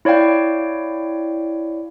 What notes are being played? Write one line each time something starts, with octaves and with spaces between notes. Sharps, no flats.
E4 C#5 D5 F5 G5